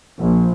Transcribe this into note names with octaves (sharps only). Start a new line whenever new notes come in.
A#1